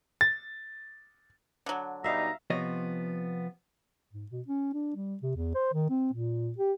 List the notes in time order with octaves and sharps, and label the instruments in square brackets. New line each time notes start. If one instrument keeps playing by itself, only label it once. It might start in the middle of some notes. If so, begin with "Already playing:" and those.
[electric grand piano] A6
[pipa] D3 F#3
[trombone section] B2 G3 D#4 [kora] E5 F5 [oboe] A#5
[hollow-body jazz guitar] C3 F3 B3 C#5 D#5
[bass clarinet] G#2
B2
C#4
D4
G3
C3
E2
C5
D#3
C4
A#2
G4